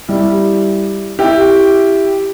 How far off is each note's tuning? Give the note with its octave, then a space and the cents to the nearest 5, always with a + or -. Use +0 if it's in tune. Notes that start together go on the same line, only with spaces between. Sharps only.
G3 +0 E4 +0
E4 +5 G4 +0